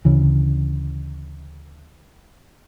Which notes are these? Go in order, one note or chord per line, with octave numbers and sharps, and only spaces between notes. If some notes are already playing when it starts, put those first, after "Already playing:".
D2 C#3 E3